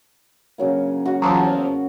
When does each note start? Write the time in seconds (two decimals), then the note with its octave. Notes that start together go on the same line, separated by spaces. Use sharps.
0.58 C#3 F#3 A#3
1.06 F#4 F#5
1.22 E2 F3 F#3